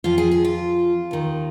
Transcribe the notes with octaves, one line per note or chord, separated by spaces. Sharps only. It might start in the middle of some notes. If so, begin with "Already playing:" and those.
F2 F3 F4
G#4
G#4
F4
D#2 D#3